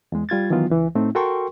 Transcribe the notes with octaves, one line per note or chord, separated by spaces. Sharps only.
E2 G#3
G3 F4 G#6 A6
D#3 E3 F#3 B3 F4
C#2 E3
A2 A3 C4 D#4
F#4 A4 A#4 G5 C6 C#6